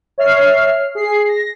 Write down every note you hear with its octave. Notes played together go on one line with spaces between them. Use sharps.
C#5 E5 F6 C7
G#4 C7
A#6